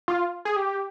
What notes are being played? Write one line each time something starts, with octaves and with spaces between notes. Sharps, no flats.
F4
G#4
G4